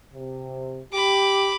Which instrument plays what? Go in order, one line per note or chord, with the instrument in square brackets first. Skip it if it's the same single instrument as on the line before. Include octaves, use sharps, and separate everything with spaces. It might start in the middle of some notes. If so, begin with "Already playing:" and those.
[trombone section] C3
[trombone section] G4 [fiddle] B5 D6